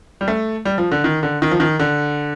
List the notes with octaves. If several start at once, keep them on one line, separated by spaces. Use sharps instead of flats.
G3
A3
G3
F3
D3
D#3
D3
D#3
F3
D#3
D3